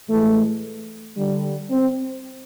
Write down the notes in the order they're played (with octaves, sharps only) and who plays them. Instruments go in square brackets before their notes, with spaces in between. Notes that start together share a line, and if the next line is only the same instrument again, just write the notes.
[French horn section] A2 E3 G#3 A3
D3 G3
C4